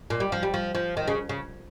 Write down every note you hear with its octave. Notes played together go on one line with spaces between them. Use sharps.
A#2
G3
F3
G3
F3
F3
D#3
C#3
C#3